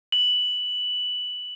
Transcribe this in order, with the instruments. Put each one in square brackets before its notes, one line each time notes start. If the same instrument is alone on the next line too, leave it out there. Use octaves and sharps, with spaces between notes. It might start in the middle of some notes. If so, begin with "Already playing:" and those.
[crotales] F#7